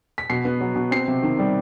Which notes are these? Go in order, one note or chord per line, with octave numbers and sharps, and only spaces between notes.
B6
B2 C7
B3
F#3
B2
C4 C7
C3
D#3
G3